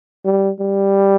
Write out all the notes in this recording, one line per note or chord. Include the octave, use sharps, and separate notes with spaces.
G3
G3